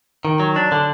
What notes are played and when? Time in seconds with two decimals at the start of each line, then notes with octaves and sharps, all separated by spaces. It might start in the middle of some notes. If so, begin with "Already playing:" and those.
0.25 D#3
0.40 F#3
0.56 D4
0.72 D3